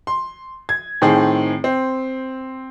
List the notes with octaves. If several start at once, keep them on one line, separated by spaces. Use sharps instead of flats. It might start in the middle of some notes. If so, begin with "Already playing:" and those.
C6
G#6
A2 D#3 C4 G#4
C4